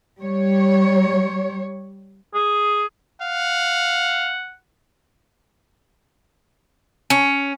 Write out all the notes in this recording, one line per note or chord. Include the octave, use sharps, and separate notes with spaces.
G3 C#5
G#4
F5 F#5
C#4